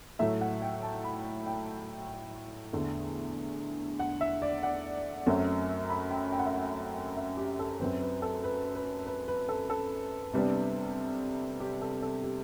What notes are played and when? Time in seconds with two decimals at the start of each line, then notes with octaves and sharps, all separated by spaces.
0.19 A2 F#3 A3 E5
0.41 F#5
0.62 G5
0.83 A5
1.04 B5
1.46 G5
2.73 E2 D3 A3
3.99 F#5
4.21 E5
4.42 D5
4.63 F#5
5.26 F#2 F#3 A3 C4
5.90 B5
6.10 G5
6.32 G5
6.39 F#5
6.46 E5
6.53 F#5
7.17 E5
7.37 G4
7.59 A4
7.80 F#2 F#3 C4 B4
8.01 B4
8.22 A4
8.44 B4
8.75 B4
9.07 B4
9.28 B4
9.49 A4
9.70 A4
10.33 C3 G3 B3 D4
11.60 G4
11.82 A4
12.02 A4
12.23 G4